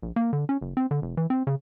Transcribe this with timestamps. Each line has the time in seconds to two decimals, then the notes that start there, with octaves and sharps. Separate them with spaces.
0.03 A#1
0.16 A#3
0.33 D3
0.49 C#4
0.61 F#1
0.77 C4
0.91 D3
1.02 F1
1.17 E3
1.30 C4
1.47 C#3